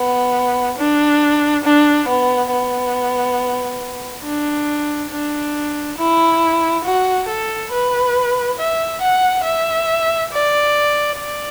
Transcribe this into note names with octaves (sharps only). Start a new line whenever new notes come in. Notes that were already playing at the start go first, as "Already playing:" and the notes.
Already playing: B3
D4
D4
B3
B3
D4
D4
E4
F#4
A4
B4
E5
F#5
E5
D5
D5